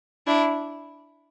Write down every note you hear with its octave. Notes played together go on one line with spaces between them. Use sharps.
D4 E4